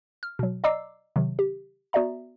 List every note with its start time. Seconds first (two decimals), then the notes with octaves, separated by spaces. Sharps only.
0.23 F6
0.39 B2 F#3
0.64 D5 D#5 A#5 D6 E6 C7
1.16 C3 D#3 F#3
1.39 G4
1.93 B3 F#4 D5 E5 A#5